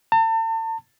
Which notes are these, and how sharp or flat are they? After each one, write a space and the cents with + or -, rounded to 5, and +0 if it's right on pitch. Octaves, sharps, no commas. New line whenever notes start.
A5 +40